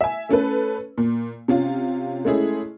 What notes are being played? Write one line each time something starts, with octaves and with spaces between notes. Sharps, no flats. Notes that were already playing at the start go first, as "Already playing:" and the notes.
E5 G#5
A3 C#4 A4 B4
A#2
C3 C#4 F4
G#3 A3 C#4 E4 G#4